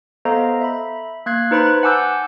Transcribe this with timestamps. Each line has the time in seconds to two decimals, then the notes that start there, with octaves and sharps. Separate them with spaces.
0.25 B3 A4 C5 D#5 F5 A#5
0.61 E5 B5
1.26 A#3 F#6 G#6 C7
1.51 D#4 B4 C5 B5 F#6
1.83 F#5 G#5 A5 D6 E6 G6